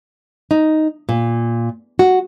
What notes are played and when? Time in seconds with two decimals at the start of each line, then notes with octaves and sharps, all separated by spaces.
0.51 D#4
1.09 A#2
1.99 F#4